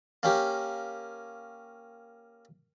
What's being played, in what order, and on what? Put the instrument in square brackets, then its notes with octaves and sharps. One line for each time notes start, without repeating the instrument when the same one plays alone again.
[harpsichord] A#3 C#4 G4